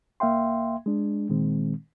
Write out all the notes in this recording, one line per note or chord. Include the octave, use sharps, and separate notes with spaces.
C2 A#3 E5 F5 G5 C6
G#3 D4
A#2 D#3 G#3 C4